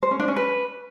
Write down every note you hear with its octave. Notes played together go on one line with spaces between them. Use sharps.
C5
C#4
D4
C#4
B4